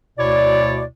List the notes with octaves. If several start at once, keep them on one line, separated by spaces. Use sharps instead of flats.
D2 B2 E4 C#5 D5